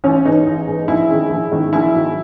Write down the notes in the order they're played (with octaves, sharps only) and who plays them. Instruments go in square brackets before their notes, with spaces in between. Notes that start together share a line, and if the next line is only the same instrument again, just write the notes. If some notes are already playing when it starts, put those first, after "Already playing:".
[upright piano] A1 [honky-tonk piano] C#4
[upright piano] G#2 E3 [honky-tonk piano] D#4
[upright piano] A1
G#2 E3
[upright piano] A#1 [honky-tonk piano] E4
[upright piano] G#2 D#3 G#3 C#4
A#1
G#2 D#3 G#3 C#4
[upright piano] A#1 [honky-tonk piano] E4
[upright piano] G#2 D#3 F#3